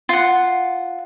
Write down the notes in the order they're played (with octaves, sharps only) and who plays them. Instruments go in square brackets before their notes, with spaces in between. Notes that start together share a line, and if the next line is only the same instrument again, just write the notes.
[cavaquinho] F4 F#5